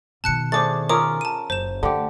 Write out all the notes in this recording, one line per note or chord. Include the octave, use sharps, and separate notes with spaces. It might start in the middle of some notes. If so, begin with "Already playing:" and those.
B2 D#3 A5 F#6 C#7
A3 D4 G#4 C5 D6 A6
C#4 F4 A#4 D6 D#6
A5 D#7
F#1 C5 E7
D3 A3 G4